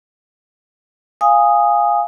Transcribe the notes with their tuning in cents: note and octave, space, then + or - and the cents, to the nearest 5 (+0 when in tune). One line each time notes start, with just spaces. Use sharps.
F5 +0 G#5 -15 D#6 +0